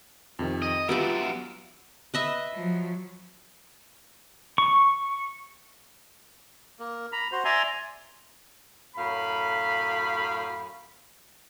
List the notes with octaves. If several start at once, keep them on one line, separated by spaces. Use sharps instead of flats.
F2 C3 D#3
D#5
F#3 B3 F4 G4 D5 E5 D7
B4 D#5 E5
F3 F#3
C#6
A#3
A#5 B5
F#4 C5
D5 E5 G#5 A#5 C6
F#2 A2 F5 B5